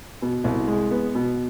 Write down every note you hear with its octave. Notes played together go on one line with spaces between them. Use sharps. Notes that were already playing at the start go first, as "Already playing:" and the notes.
B2
C2
G#3
B3
B2